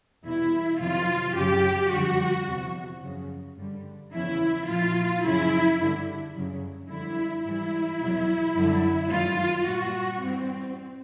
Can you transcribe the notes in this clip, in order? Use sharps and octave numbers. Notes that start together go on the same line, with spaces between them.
E2 B2 G3 E4
F2 C3 D#3 F#3 F4
F#2 C#3 F#3 G4
F2 D3 G3 F#4
E2 C3 F3
F#2 C#3 F3
G2 D3 G3
E2 C#3 F3 E4
A#2 F3 F4
F#2 C#3 F3 E4
G2 D3 G3
F#2 C#3 F#3
F2 D3 G3 E4
G#2 E3 G3 E4
E2 B2 F#3
F#2 D3 G3
G2 D#3 F#3 F4
A#2 G3 F#4
G2 E3 G3 C4